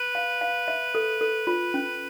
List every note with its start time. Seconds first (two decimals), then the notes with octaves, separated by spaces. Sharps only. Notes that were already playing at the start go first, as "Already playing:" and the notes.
Already playing: B4
0.15 F5
0.41 F5
0.68 E5
0.95 A4
1.21 A4
1.47 F4
1.74 C#4